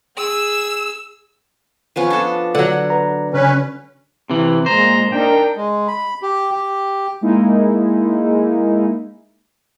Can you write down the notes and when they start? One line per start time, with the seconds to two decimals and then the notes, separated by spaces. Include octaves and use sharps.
0.17 G#4 E6
1.96 F3 B3 C#4
2.10 D4 A4
2.55 D3 F#3 F#5
2.90 B4 A#5
3.34 C#3 C#4 B4
4.30 C3 E3
4.66 A#2 G#3 C5 A#5
5.12 D4 D#4 A#4 G5
5.56 G#3
5.88 B5
6.22 G4
6.52 G4
7.21 G#3 A#3 D#4 E4